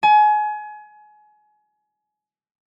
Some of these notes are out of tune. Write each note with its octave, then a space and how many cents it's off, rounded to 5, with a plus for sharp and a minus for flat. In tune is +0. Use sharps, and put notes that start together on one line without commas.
G#5 +30